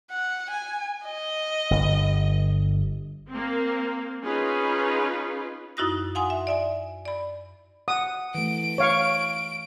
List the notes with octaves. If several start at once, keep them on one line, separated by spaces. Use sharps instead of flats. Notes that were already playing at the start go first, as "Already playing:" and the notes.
F#5
G#5
D#5
G1
A#3 C4
C#4 D#4 F4 G#4 B4
F#2 D#4 E4 F#4 D#6 A#6
F5 F#5 G#5 C6 D#6
E5
D5 E5 G#5
D5 B5
F#5 D#6
E3 A3 D7
C#5 F5 C#6